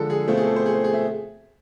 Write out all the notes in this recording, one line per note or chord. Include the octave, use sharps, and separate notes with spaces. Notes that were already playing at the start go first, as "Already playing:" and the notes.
Already playing: D3 F3 G#3 A4
G#4
B2 A3 C4 F4
G#4
A4
C5
G#4
C5
G#4
E5